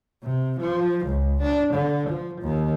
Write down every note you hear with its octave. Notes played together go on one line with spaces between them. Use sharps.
C3
F3
C#2
D4
D3
F3
D#2